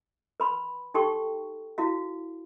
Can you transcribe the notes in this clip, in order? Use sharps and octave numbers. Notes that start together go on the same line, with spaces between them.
B4 B5 C6
D#4 G4 A4 G5 C6 C#6
E4 F#4 F5